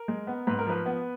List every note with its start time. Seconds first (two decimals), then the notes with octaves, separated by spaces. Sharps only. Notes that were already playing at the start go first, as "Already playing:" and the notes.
Already playing: A#4
0.08 G#3
0.27 B3
0.47 G#2 B4
0.58 A#4
0.67 F3 B4
0.86 B3